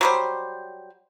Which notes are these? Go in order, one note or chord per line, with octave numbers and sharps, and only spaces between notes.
F#3 G3 C5